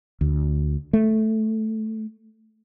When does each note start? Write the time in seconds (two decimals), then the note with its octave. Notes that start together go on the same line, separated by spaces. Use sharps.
0.21 D2
0.93 A3